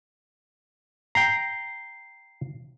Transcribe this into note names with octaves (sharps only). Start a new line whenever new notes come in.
G5 A#5 C7